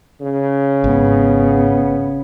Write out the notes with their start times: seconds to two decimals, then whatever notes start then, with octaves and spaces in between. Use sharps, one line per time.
0.21 C#3
0.84 G#1 B3